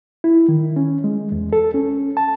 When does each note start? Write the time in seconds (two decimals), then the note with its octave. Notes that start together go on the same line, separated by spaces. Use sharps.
0.24 E4
0.48 D#3
0.76 C#4
1.04 G#3
1.32 E2
1.53 A4
1.74 C#4
2.17 A5